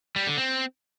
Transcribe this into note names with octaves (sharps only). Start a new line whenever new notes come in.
G3
D3
C4